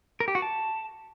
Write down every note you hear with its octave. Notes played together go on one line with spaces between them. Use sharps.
A#4
G4
F#4
A5